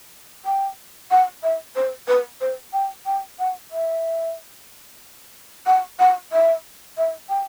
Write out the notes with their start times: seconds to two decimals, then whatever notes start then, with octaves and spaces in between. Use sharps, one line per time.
0.45 G5
1.11 F#5
1.43 E5
1.76 C5
2.08 B4
2.41 C5
2.73 G5
3.06 G5
3.39 F#5
3.71 E5
5.66 F#5
5.99 F#5
6.32 E5
6.97 E5
7.29 G5